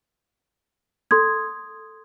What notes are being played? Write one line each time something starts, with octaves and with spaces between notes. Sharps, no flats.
A4 C6 D#6 G#6